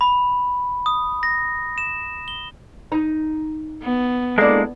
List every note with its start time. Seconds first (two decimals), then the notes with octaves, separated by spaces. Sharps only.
0.01 B5
0.86 D#6
1.23 A#6
1.78 E7
2.28 G7
2.92 D#4
3.83 B3
4.38 G#3 A#3 D4 E4 A4